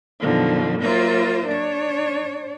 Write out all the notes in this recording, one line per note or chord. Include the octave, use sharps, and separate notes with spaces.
F#2 B2 D3 D#3 F3
F#3 A#3 F4 A#4 C5 E5
D4 C#5